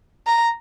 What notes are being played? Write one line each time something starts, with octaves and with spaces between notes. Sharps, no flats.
A#5